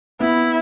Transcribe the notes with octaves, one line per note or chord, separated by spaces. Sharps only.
B3 E4